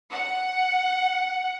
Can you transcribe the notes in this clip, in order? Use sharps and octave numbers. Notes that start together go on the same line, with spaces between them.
F#5